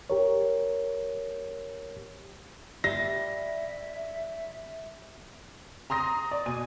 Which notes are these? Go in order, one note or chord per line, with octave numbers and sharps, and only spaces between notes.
G4 A#4 C#5
G3 E5 A#6
A#5 C6 D#6 A#6
D5
B2 G#5 D#7